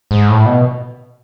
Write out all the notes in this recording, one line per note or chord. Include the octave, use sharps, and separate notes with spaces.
G#2
A2
B2